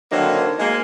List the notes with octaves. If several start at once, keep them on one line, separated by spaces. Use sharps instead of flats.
D3 D#3 F#3 A#3 C4 D#4
G#3 A#3 D#4